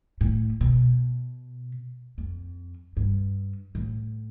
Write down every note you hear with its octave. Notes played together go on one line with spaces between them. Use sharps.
A2
B2
F2
G2
A2